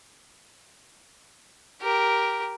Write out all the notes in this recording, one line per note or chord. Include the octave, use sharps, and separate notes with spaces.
G4 A#4